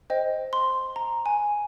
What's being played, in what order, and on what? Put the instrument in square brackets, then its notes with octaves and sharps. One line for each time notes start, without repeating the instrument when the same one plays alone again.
[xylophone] C5 D#5 G5
C6
A#5
G#5